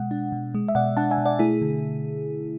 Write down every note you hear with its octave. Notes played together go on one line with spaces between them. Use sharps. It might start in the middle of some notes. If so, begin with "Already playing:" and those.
Already playing: B2 G#3 F#5
D4
B2
G#3
E5
B2 D5 F#5
D4 F#5 A5
E5 G#5
B2
D5 F#5
A3 E4 G#4
D3